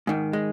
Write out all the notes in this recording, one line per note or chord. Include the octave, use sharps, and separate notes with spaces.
G#2 D#3
G#3